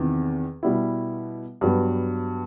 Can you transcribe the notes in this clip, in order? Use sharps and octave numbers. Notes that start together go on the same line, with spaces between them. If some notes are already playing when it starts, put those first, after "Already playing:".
Already playing: E2 C3 D#3
B2 G3 B3 E4
G2 F#3 B3